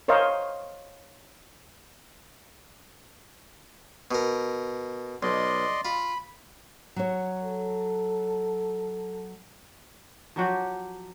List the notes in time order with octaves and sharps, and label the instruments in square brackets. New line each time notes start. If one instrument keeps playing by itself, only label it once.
[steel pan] A#4 C5 C#5 D#5 F5
[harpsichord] B2 A#4
[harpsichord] B1 [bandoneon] D5 D#5 C6
[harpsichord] F4 [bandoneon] B5
[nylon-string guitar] F#3 C#5
[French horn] A4
[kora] F3 F#3 F#4 G4